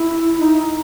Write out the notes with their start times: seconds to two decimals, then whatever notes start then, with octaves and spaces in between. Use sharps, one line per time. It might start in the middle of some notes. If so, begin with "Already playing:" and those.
Already playing: E4
0.39 D#4